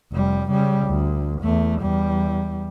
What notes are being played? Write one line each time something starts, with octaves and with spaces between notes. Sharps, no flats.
F1 G3
C#3 G3
D2
E2 A3
E2 G3